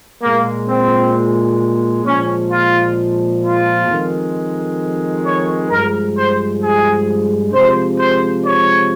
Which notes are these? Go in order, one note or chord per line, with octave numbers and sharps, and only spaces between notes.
A#2 G#3 A#3
C4
A#2 F3 G#3 C#4
F4
F4
F2 D#3 G#3
C#5
G2 F3 G#3 A#4
C5
G#4
C3 F3 G#3 C5
C5
C#5